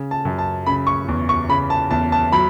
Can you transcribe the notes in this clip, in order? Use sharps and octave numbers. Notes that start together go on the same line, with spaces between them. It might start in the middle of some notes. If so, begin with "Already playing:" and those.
Already playing: C#3
A5
F#2
A5
C#3 B5
C#6
E2
C#6
C#3 B5
A5
E2 A5
A5
F#3 B5